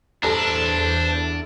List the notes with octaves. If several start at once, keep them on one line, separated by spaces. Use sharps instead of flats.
E2 G2 D4 A4 C5 A#5